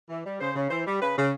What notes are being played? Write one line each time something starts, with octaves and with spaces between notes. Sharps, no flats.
E3
G3
C#3 C5
C#3
E3 C5
G3
C#3 B4
C#3